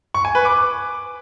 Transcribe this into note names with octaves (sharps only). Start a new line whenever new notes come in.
C#6
G#5
B4
D6